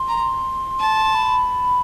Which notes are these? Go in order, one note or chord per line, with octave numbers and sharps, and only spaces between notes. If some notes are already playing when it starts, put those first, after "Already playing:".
Already playing: C6
A#5
A5
B5